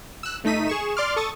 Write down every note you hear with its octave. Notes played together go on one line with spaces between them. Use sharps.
E6 F#6
G1 A3 D#4 B6 D#7
G#4 C#6 E7
D5 C6 D6 F6
A4 C#6 D#6 A6